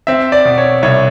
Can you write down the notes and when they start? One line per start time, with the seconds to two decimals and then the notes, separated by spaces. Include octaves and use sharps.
0.07 C4 E5
0.32 D5
0.45 B2
0.58 C#5
0.83 C2 C#5